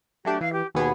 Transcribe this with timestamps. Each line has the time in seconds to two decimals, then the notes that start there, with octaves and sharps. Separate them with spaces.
0.25 F#3 A3 D4 G4
0.41 E3 F5
0.53 G4
0.75 D#2 B2 B3 G#4